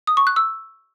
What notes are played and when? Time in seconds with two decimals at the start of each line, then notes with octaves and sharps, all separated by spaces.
0.07 D#6
0.17 C#6
0.27 F#6
0.36 E6